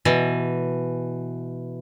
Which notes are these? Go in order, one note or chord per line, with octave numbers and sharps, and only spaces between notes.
B2 E3